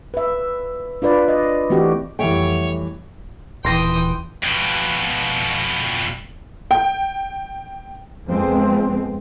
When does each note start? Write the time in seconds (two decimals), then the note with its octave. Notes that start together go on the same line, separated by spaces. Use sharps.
0.14 B4 E5
1.02 D4 F4 B4 D5
1.28 D#5
1.70 E3 A3 C4 F#4 G4
2.19 F2 E3 G3 A3 C#5 E5 F#5 G5
3.65 D#1 E3 G5 C6 D#6 A#6
4.44 F2 B2
6.71 G5
8.26 F2 G#3 B3 C4